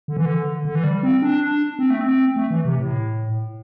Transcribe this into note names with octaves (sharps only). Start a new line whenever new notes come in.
D3
E3
D3
D3
E3
G3
C4
D4
C4
A3
C4
A3
E3
C3
A2